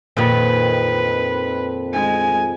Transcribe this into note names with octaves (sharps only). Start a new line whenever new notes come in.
F2 A#2 D#3 B4
G#3 G#5